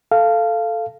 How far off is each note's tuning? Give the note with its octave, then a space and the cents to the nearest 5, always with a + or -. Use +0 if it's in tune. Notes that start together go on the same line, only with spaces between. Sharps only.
A4 +0 F5 -15